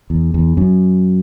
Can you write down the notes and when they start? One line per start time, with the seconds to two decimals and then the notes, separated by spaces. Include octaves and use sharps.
0.10 E2
0.34 E2
0.57 F#2